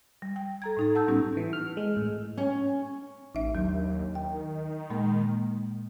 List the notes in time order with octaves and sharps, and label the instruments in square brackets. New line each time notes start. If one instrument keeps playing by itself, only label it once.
[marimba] G3
G5
A4 A#5 G#6
A2 D#4 A4
F#5 A5 E6 G6
A2 G3 B3 C#4 D#4 G4
[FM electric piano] E3
F6
G#3
A2
[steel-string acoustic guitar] C#4 G#5
[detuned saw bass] A1 [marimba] D#4 E5
[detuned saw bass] D#2 [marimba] F#3 D4
[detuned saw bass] D#3 [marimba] G5
[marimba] A#2 G#3 A#3